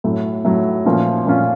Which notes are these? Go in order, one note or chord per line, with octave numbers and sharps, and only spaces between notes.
A2 F#3 A3
A2 F#3 A3
A#2 F3 A3 C#4 F4
A#2 F3 A3 C#4 F4